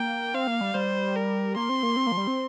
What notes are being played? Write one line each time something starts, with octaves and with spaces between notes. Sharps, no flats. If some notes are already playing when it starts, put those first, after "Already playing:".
Already playing: A#3 G5
C4 F5
A#3
G3
G3 C5
A#4
A#3 C6
C4
A#3
C4
A#3
F3
G3
C4